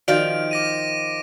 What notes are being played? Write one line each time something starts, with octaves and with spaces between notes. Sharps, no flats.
D#3 F3 F4 F#4 D5 F5 D7
D6 A#6 D#7